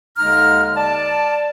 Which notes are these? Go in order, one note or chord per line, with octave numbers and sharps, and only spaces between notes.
D#2 D3 G#3 D#4 A#5 F6
D5 A5